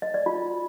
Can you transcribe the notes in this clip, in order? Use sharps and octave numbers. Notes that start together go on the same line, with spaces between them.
D#5
D5
F4